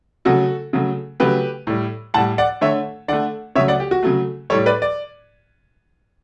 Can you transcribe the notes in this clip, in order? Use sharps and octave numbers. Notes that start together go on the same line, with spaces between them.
C#3 F#3 A3 F#4 A4
C#3 F#3 A3
C#3 F#3 A3 G4 B4
A2 G3
A2 G3 F#5 A5
D5 F#5
D3 A3 C#5 E5
D3 A3 D5 F#5
C#3 F#3 A3 C#5 E5
D5 F#5
G4
F#4
C#3 F#3 A3
A2 G3 A4 C#5
B4 D5
D5